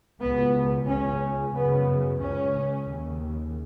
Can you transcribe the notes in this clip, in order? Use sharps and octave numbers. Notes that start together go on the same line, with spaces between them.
C#2 B2 B3
C#2 C#3 C#4
F#2 C#3 B3
C#2 C#3 C#4
D#2 C#3